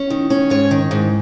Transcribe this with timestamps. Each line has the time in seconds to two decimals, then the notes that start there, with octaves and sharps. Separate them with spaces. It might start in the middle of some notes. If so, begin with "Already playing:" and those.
Already playing: C#4
0.10 D#3
0.30 C#4
0.50 G#2 C#5
0.71 D#3
0.91 G#2